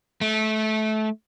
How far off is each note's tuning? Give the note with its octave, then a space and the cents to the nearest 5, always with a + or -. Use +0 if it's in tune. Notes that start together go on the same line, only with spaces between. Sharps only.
A3 -20